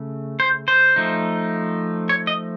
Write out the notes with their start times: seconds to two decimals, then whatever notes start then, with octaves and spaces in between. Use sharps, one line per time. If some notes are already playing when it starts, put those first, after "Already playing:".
Already playing: C#3 A3
0.40 C5
0.68 C5
0.96 F3 A3 D#4
2.09 C#5
2.27 D#5